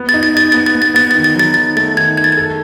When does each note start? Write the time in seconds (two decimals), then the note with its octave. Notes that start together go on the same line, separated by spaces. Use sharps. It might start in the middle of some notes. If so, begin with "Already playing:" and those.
Already playing: B3
0.09 A6
0.14 D#4
0.23 A6
0.34 D#4 A6
0.52 B3 A6
0.66 A6
0.75 B3
0.82 A6
0.94 B3 A6
1.11 A6
1.15 D#3
1.24 A6
1.35 F#3 A6
1.54 D#3 A6
1.76 A3 A6
1.97 D#3 G#6
2.17 D#3 G#6
2.24 A6
2.32 A4 G#6